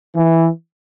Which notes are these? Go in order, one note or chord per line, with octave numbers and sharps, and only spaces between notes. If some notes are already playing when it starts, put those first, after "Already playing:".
E3